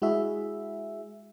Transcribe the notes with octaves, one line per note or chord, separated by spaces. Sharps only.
G#3 E4 F#4 G#4 E5